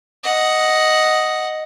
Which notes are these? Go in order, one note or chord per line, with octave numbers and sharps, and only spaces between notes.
D#5 F#5